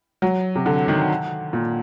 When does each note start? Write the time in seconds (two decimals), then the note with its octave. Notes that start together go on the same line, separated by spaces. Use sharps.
0.22 F#3
0.55 C3
0.66 D3
0.88 D#3
1.53 A#2